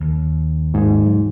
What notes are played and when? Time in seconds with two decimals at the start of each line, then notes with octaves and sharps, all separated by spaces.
0.01 D#2
0.74 G#2
1.06 E1 F#3